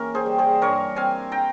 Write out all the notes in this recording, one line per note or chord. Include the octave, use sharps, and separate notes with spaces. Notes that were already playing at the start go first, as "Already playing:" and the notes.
Already playing: E3 A#3 C#4 A#4
G#4 C5
G3
G#4 C5
G2 A#4 C#5
C4 F5 G#5
G5 A#5